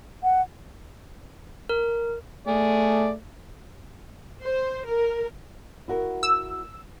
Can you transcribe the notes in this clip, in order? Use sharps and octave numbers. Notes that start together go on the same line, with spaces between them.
F#5
A#4
A3 G#4 D5
C5
A#4
E4 F#4 A#4
E6